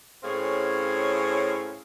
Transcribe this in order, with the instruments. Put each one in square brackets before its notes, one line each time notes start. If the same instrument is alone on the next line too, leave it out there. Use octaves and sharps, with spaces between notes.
[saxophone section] A2 C4 C#4 G#4 F5